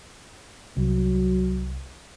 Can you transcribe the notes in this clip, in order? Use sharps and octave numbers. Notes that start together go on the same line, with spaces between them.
C2 F#3